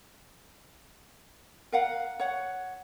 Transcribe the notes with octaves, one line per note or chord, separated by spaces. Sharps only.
A#4 F5 F#5
C#5 F#5